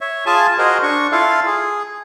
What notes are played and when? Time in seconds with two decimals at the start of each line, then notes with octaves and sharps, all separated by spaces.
0.01 C#5 E5
0.26 F4 G#4 G#5 A5
0.58 F#4 G#4 A#4 C5 D#5
0.83 D4 C#6
1.12 E4 F4 A4 F5
1.46 G#4